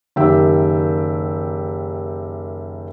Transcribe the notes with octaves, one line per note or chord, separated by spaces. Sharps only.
F#1 D#3 G4 E5 G5